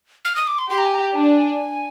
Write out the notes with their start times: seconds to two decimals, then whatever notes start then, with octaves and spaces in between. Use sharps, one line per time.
0.25 F6
0.36 D#6
0.47 D6
0.58 C6
0.70 G4 C6
0.78 A#5
0.86 G#5
0.94 A#5
1.15 D4 G#5